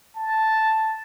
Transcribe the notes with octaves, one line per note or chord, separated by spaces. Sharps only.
A5